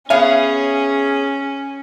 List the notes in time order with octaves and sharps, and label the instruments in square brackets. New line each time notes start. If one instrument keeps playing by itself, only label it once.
[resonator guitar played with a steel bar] B3 C#5 F5 [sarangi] C#4 [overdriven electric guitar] G#4 G#5 [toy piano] E5